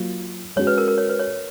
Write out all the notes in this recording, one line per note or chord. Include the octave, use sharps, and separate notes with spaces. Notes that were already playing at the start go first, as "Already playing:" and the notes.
Already playing: F#3 A#3 F4
G#3 C#4 F#4 C#5
B4
A#4
A#4
C#5
B4
C#5